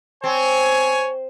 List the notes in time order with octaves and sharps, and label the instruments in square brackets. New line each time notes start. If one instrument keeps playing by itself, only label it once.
[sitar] C4 [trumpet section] C#5 G#5